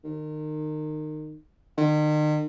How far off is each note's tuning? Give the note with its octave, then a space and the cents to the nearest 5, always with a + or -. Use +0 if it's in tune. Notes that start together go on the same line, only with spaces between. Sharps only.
D#3 -25
D#3 -40